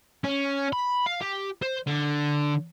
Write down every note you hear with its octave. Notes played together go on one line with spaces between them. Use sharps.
C#4
B5
F5
G4
C5
D3